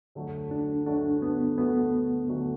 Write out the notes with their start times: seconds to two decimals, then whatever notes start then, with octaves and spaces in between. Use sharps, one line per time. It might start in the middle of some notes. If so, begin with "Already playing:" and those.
0.15 D2 D3 F#3 A3 F#4
0.51 D4
0.86 D2 D3 F#3 A3 D4 F#4
1.22 B3
1.58 D2 D3 F#3 A3 B3 F#4
2.29 D2 D3 F#3 A3 F#4